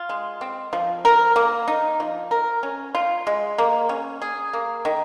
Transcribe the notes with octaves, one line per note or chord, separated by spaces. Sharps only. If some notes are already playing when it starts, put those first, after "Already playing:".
Already playing: F4
G#3
C4
F3
A#4
A#3
D#4
F3
A#4
C#4
F4
G#3
A#3
C#4
G#4
A#3
D#3